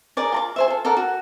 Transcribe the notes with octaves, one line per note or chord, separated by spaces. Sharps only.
G#4 A#4 D5 G#5
F4 A#5 D6
G#4 C5 E5
F4 A4
A4 A#4 D5 F#5
F#4